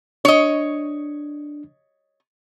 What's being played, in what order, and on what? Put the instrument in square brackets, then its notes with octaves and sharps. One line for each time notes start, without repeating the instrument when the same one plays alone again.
[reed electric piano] D4 [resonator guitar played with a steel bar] C#5 D#5